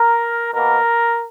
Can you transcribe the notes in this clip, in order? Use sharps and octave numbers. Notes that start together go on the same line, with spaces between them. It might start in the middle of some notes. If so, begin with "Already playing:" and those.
Already playing: A#4
B2 A#3 A#4